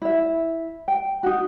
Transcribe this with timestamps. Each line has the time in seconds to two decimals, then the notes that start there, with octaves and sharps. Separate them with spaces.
0.02 E4 E5
0.88 G5
1.23 D#4 F#4